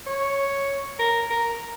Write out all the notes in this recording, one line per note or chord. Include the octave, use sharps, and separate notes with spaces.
C#5
A#4
A#4